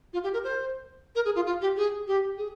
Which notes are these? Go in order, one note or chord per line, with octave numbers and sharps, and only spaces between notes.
F4
G4
A#4
C5
A#4
G#4
F4
F4
G4
G#4
G4
G#4